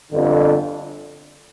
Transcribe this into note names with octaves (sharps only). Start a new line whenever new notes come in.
G1 F2 D3